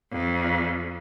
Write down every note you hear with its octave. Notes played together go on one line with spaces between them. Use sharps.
F2